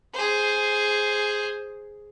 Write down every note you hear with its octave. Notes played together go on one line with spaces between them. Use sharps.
G#4 C5